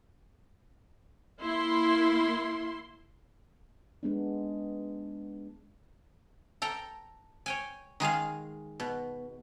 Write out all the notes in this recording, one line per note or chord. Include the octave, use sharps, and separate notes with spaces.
A#3 E4 C6
G#3 B3 D4
A4 G5 A#5
C#5 G5 G#5
D#3 G#3 G#4 F5
B2